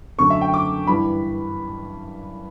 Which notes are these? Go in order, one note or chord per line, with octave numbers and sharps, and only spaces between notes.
F#2 D3 A3 C#6
E5
G5
D6
G2 E3 G3 B5